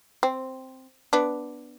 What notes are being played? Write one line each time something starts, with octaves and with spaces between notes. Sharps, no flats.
C4
B3 D4